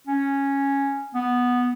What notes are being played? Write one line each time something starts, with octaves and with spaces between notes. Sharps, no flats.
C#4
B3